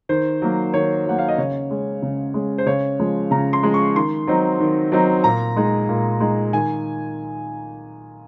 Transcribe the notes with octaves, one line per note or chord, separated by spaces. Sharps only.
D#3 C5
F#3 A#3
D#3 C#5
F#3 A#3 F#5
F5
D#5
C#3 C#5
G#3 C#4
C#3
G#3 C#4
C5
C#3 C#5
F3 G#3
C#3 A#5
C6
F3 G#3
C#6
D#3 C6
F#3 C4 D#4
D#3
F#3 C4 D#4
A#2 A#5
G#3 D#4
A#2
G#3 D#4
D#3 G#5